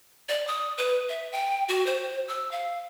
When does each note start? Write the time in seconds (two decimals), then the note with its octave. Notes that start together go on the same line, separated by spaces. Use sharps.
0.29 D5
0.47 D#6
0.78 B4
1.09 E5
1.32 G5
1.69 F#4
1.87 C5
2.28 E6
2.51 F5